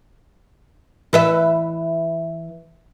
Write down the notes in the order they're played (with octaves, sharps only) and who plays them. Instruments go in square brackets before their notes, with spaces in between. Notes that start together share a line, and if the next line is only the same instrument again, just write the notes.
[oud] E3 B4 E5